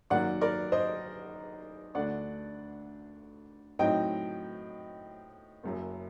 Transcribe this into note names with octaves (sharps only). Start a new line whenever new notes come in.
F#2 D#3 F#3 A#3 D5 F#5
A#4 D5
C5 D#5
D2 D3 A3 D4 D5 F#5
A2 F#3 C4 D#4 D#5 G5
F#1 F#2 F#3